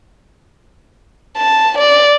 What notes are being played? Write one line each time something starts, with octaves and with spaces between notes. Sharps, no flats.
A5
D5